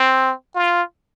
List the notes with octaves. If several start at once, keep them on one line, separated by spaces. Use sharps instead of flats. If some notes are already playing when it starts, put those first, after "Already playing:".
Already playing: C4
F4